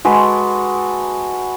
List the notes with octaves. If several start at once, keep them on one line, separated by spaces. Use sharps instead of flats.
G#3 F#4 A4 B4